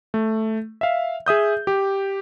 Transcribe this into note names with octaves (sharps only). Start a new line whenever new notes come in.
A3
E5 F5
G#4 E5 D#6 G6
G4